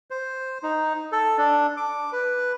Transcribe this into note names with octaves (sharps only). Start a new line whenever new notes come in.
C5
D#4
A4
D4
D6
B4